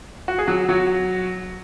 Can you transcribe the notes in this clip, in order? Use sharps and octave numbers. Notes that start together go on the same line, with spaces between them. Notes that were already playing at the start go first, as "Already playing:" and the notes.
F#4
G#4
F#3 F#4
F#3 F#4